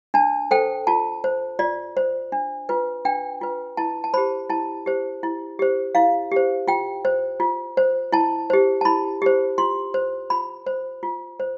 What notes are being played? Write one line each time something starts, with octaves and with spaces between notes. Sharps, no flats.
D4 A5
A4 C5 G5
F4 A5
C5
F4 D5
C5
D4
F4 B4
D4 G5
F4 B4
E4 A5
A5
G4 C5 B5
E4 A5
G4 C5
E4
G4 C5
E4 F5
G4 C5
F4 G5
C5
F4
C5
E4 A5
G4 C5
A5
E4 B5
G4 C5
F4 C6
C5
F4 B5
C5
F4
C5